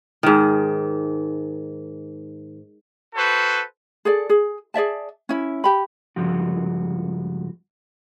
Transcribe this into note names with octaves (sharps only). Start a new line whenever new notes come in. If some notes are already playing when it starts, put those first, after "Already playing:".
G#2 D#3
F#4 A4 B4 C5
G#4 A4 D5
G#4
G#4 D5 E5 A5
C#4 E4
G4 B5
C#2 G2 F3 F#4